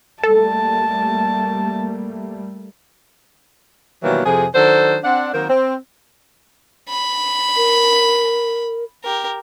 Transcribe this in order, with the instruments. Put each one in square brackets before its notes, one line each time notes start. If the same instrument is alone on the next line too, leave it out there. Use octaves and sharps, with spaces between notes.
[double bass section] G3 A3 A#3 [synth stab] A4 [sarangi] A5
[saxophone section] B2 D#3 E3 F#3 G3 A#3
F2 C3 G#4
D#3 F#3 D4 A4 C5
C4 D4 F#5
D#3 F#3 A#3 C4 A#4 C5
C4
[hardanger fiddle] B5
[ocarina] A#4
[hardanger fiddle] G4 A#4